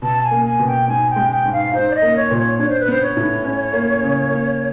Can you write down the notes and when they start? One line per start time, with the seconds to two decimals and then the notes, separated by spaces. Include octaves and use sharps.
0.02 B2 A5
0.23 G#5
0.31 A#3
0.45 G#5
0.59 B2
0.66 G5
0.88 G#2 G#5
1.10 G5
1.16 G#3
1.31 G5
1.45 G#2
1.52 F5
1.73 D#4 C5
1.91 D5
1.95 D#5
2.02 A#3
2.16 C#5
2.31 A#2
2.38 C#5
2.59 D4 C#5
2.69 C5
2.80 B4
2.88 B3 C5
3.02 C#5
3.17 A2
3.45 C#4
3.73 A#3
4.02 C#3
4.30 A#3